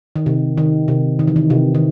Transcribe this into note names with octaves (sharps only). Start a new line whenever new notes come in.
D#3
C3
D#3
C3
D#3
E3
D#3
C3
D#3